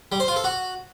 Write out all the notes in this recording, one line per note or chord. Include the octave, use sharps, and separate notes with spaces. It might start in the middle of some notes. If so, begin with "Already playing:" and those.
G3
C5
F4
A4
F#4